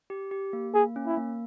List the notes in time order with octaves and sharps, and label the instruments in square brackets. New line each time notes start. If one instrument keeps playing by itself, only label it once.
[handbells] G4
G4
A#3
[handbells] A#3 [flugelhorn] G#4
[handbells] C#4
[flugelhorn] E4
[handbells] A#3